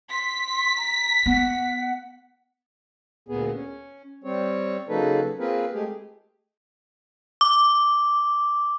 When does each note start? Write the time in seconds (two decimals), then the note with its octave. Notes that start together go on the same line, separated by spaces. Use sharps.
0.11 C6 B6
0.77 A#5
1.26 B3 F#5
3.29 D2 A#2 B3 G#4
3.54 C#4
4.24 G3 C4 C#5
4.89 C#3 F#3 A#3 D#4 A4 B4
5.39 A#3 C4 F4 G#4 A#4 B4
5.73 G#3 A3 G4 G#4
7.41 D6